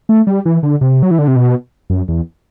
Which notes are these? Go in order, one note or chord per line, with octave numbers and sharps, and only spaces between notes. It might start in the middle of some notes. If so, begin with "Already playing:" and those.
A3
G3
E3
D3
C3
F#3
E3
D3
C3
B2
F#2
E2